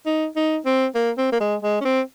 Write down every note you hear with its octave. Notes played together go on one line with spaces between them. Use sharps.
D#4
D#4
C4
A#3
C4
A#3
G#3
G#3
C#4
C4